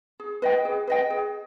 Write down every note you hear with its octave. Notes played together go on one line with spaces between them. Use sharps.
G#4
B4 D#5 G5
G#4
B4 D#5 G5
G#4